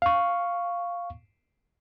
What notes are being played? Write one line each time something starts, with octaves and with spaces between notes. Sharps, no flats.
F5 C#6